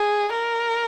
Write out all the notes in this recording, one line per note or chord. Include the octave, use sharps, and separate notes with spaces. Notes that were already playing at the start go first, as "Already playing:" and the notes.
Already playing: G#4
A#4